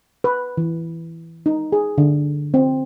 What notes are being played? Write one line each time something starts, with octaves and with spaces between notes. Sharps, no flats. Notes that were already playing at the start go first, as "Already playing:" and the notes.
B4
E3
D#4
G#4
D3
C4